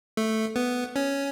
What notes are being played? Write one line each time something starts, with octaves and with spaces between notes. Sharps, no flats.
A3
B3
C#4